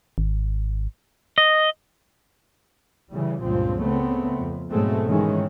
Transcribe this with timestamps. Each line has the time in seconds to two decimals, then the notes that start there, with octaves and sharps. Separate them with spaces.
0.18 G#1
1.38 D#5
3.11 C#3 E3 G3
3.42 C#2 G2 A#2 F3 C4
3.81 C#3 A3 B3 C4
4.38 F2
4.70 G#2 B2 F#3 G#3 A3 C4
5.08 G#2 D#3 E3 G#3 C#4